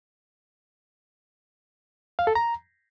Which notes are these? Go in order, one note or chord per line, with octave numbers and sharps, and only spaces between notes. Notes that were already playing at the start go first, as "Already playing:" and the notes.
F5
A4
A#5